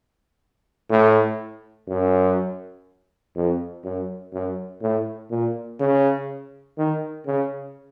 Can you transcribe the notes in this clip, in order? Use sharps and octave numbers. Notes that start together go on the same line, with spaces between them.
A2
F#2
F2
F#2
F#2
A2
A#2
C#3
D#3
C#3